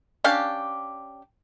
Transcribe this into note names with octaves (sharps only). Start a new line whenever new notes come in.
C#4 D4 G4 F5